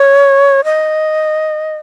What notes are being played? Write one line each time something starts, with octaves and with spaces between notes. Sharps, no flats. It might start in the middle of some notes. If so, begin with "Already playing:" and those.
Already playing: C#5
D#5